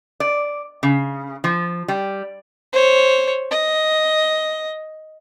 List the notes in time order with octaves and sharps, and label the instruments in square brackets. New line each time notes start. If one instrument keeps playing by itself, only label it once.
[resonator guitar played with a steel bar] D5
C#3
F3
G3
[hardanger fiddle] C5 C#5
D#5